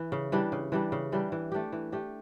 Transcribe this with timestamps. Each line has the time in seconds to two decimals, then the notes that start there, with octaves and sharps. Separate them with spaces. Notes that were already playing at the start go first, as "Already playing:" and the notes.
Already playing: E3
0.12 C#3
0.32 E3 G3 D4
0.52 C#3
0.72 E3 G3 D4
0.92 C#3
1.12 E3 G3 D4
1.32 E3
1.52 A3 D4 G4
1.72 E3
1.92 A3 D4 G4